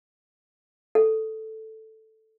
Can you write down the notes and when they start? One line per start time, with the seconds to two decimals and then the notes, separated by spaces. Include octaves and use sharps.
0.95 A4